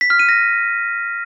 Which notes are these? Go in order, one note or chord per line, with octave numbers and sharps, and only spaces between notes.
B6
F6
D#7
A#6